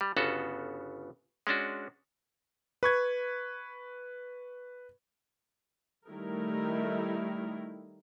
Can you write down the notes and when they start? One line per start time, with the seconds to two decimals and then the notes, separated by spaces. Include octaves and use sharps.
0.01 G3
0.16 G1 C#3 B3 F#4 A4
1.47 G#3 C#4 D4 F#4
2.83 B4 C#6 G#6
6.09 D#3 G3 A3 D#4 E4 A#4